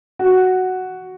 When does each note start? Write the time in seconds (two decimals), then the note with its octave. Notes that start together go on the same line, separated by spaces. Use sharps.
0.19 F#4